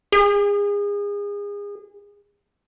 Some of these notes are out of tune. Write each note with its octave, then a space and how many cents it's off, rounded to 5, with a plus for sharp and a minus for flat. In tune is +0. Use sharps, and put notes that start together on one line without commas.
G#4 -30